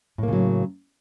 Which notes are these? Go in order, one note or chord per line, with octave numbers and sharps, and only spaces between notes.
A2 C#3 F#3 A#3